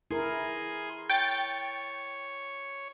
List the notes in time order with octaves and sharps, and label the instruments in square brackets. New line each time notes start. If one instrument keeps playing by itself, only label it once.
[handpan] E4 A#4 [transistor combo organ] G#4 C6
[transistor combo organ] C#5 [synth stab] G5 A6